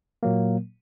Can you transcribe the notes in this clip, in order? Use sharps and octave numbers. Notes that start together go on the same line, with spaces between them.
A#2 F#3 A#3